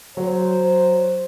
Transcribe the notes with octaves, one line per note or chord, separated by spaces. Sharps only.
F#3 C5